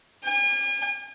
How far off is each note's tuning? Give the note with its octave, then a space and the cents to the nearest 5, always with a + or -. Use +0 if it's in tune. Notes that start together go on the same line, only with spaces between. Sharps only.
G#5 -40